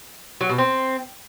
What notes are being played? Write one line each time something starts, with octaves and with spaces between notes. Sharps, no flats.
F#3
B2
C4